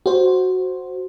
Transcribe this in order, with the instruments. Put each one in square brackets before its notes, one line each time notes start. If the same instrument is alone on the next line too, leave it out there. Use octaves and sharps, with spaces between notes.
[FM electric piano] F#4 C5